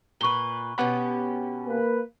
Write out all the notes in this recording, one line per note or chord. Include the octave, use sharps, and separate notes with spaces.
A#2 B4 C#6 G7
B2 B3 C#4 G4 F#5 B5
A#3 B4